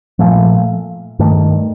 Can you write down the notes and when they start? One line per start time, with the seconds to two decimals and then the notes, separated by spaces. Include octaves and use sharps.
0.19 A#2 F3 A3
1.19 G2 D#3 A3